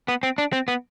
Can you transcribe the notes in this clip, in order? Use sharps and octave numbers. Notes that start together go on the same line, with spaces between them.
B3
C4
D4
C4
B3